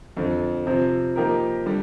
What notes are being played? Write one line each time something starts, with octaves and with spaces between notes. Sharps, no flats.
F2 D3 F3
C3 F3 C4
F3 A#3 D#4 G4 A#4
D3 G3